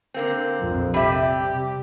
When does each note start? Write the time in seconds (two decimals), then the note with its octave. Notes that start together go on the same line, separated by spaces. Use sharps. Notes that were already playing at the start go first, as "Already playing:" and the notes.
0.14 D3 A#3 C4
0.60 A#1 F2 F3
0.94 C3 G3 G4 D5 E5